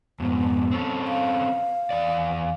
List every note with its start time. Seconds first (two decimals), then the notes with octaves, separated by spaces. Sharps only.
0.20 F2 G#2 B3
0.71 C4 C#4 A4
1.08 F5
1.90 E2 D5